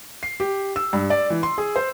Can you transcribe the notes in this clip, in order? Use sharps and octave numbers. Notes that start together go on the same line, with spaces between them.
C7
G4
E6
G2
D5
E3
C6
G#4
C5